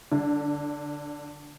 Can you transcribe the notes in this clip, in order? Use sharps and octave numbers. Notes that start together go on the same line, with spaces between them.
D3